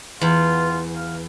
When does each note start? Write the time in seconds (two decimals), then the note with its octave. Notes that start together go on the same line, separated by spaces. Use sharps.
0.21 E2 F4
0.96 F5